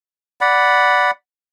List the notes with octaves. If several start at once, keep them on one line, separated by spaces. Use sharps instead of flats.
D5 F#5 B5